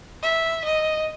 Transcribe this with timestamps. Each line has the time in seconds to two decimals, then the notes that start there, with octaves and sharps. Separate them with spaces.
0.23 E5
0.65 D#5